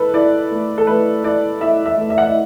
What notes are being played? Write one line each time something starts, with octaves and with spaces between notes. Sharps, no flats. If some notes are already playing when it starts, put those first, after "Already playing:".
Already playing: E4 A4 B4
E4 D5
A3
A4
A3 B4
E4 D5
E4 E5
E5
A3
E5
F#5
E5